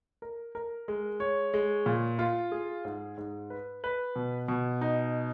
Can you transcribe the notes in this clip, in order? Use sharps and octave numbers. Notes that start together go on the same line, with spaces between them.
A#4
A#4
G#3
C#5
G#3
A#2
F4
G#4
G#2
G#2
B4
B4
B2
B2
D#4